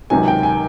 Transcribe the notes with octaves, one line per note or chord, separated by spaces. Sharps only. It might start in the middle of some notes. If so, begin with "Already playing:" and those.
C#2 C3 D#3 F#3 G#5
G5
G#5